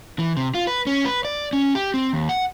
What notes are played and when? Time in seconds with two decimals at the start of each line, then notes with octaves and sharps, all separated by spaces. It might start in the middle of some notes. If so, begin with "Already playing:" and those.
0.19 E3
0.37 C3
0.54 F4
0.67 B4
0.87 C#4
1.06 B4
1.25 D5
1.53 C#4
1.75 G4
1.94 C4
2.13 D#2
2.29 F#5